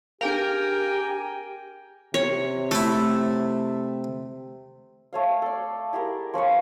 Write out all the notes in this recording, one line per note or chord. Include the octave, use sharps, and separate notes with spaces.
D4 G4 G#4 A#4 F5 G5 G#5
C3 C#5
A3 E4 A4
A3 C#5 F5
A4 D5
E4 G4 G#4 A#4
F3 C#4 B4 C#5